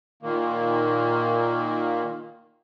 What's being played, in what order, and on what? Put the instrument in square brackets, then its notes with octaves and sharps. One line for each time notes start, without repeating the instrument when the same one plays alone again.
[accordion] A#2 D#3 A#3